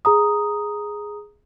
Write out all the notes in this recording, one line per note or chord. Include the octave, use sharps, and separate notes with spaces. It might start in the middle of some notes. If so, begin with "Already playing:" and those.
G#4 A#5 D#6